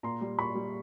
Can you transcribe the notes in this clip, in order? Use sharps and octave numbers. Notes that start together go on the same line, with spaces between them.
A#2 A#5 C6
G3
A#2 B5 C#6
G3